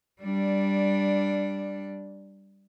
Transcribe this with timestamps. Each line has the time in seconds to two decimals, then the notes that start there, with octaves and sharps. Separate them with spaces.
0.21 G3 D4